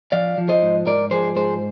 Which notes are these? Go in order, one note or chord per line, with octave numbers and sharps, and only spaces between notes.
F3 D5 F5
F3
C5 D#5
G#2
G#2 A#4 D5
F3 G#4 C5
G#2 G#4 C5